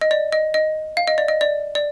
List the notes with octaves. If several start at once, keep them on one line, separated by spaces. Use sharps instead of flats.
D#5
D5
D#5
D#5
F5
D#5
D5
D#5
D5
D5